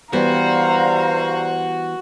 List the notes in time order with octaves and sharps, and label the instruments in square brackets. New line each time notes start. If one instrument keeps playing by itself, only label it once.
[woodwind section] G2 C5 [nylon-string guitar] E3 G3 B3 [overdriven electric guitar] F#4 [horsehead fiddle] F5 A#5